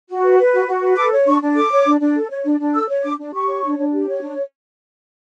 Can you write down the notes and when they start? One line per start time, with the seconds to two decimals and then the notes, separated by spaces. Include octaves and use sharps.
0.09 F#4
0.23 B4
0.38 B4
0.53 F#4
0.67 F#4
0.82 B4
0.96 A4 D6
1.12 C#5
1.26 D4 C#6
1.42 D4
1.56 A4 D6
1.71 C#5
1.86 D4
2.00 D4
2.15 A4
2.30 C#5
2.45 D4
2.60 D4
2.74 A4 E6
2.89 C#5
3.04 D4 D6
3.18 D4
3.33 G4 C#6
3.49 C#5
3.63 D4
3.78 D4
3.93 G4
4.07 C#5
4.22 D4